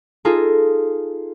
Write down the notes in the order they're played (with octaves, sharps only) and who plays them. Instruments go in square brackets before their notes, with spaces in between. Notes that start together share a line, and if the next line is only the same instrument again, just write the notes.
[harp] D#4 F4 G#4 A4